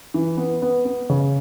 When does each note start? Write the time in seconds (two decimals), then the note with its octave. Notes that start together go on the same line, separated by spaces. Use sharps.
0.14 E3
0.37 B3
0.62 B3
0.85 B3
1.09 C#3